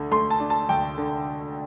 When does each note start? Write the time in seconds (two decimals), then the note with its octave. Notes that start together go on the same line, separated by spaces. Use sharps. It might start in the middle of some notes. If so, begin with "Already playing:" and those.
Already playing: D2 D3
0.11 A3 C6
0.30 A5
0.40 D4
0.50 A5
0.69 D2 G5
0.98 D3